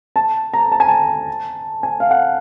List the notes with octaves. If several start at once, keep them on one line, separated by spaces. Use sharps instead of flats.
A5
A#5
A5
G#5
A5
G#5
F5
F#5